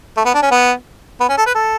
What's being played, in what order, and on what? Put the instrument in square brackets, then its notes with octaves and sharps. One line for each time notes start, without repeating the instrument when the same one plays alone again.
[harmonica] A3
B3
D4
C#4
B3
B3
C#4
A4
B4
A4